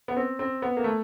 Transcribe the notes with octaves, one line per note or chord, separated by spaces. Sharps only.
B3
C4
C4
B3
A#3
A3